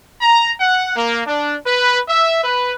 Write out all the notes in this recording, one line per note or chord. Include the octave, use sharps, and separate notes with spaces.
A#5
F#5
A#3
D4
B4
E5
B4